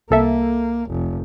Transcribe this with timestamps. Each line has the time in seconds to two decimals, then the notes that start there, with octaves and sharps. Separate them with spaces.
0.10 C2 A#3 A4 E5
0.90 F1